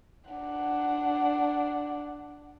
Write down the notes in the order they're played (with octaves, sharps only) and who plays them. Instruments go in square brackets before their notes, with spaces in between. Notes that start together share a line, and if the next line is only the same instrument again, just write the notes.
[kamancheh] D4 F#5